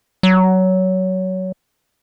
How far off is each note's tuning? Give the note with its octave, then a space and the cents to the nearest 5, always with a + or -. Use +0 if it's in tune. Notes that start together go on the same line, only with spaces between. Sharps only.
F#3 +15